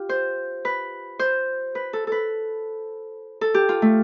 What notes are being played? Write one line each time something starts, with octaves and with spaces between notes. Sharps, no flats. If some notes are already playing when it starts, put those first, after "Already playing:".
Already playing: F4 G4
C5
B4
C5
B4
A4
A4 B4
A4
G4
F4
A3